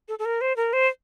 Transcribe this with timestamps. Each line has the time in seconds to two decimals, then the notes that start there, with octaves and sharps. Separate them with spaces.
0.08 A4
0.19 A4
0.25 A#4
0.41 C5
0.56 A#4
0.73 C5